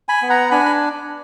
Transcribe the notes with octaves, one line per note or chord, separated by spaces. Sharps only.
G#5 B5
B3
F#5 A#5
D4 G#5 B5
B5